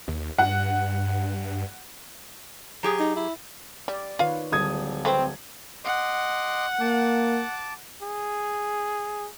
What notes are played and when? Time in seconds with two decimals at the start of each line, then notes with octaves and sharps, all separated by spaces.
0.08 D#2
0.38 G2 F#5
2.83 F#3 G4 G#4
3.00 D#4
3.16 E4
3.88 G3 D5
4.19 D#3 F4 B4 C#5 F5
4.52 D1 G3 A4 D#6 G#6
5.05 A3 C4 B4 C5
5.85 D#5 F#5 C6 D6
6.80 A#3 A5 D6
8.02 G#4